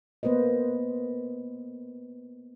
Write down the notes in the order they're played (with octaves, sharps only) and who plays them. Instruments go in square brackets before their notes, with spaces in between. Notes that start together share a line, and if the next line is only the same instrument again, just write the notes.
[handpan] A#3 B3 B4 C5 D#5